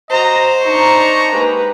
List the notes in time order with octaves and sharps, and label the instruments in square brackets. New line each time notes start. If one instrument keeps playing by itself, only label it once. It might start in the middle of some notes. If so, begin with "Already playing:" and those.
[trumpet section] F#4 A#5 [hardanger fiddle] C5 [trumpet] D#5
[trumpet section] D4 D#4 [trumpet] A#5 [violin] C#6
[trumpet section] G#3 A#3 G4 [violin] B4